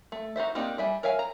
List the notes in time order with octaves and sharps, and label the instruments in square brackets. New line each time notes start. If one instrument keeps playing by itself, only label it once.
[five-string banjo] A3
D#4 F#4 C5 E5
A#3 C4 D4 D#4 G4
G3 E5 G#5
A#4 C#5 E5 F5 G#5
A#5